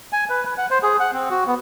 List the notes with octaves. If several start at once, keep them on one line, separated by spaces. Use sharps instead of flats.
G#5
B4
B4
F#5
C5
G#4
F#5
C4
F#4
B3